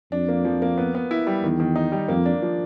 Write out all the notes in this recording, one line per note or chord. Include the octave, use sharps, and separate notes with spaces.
F2 D4
A#3
F3
A#3
B3
B3
E4
G3
E2 D#3
D#3
D#4
G3
F2 A#3
D4
F3